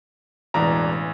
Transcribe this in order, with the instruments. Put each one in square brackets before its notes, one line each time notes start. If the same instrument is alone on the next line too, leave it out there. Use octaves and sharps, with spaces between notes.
[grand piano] E1 D5 A#5 [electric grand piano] A1 E3